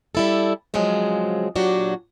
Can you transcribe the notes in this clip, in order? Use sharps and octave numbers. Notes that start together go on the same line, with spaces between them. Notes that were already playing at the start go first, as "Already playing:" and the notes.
G3 E4 A4
C#3 F3 F#3 G#3 C4
A#2 F#3 D4 F#4 G4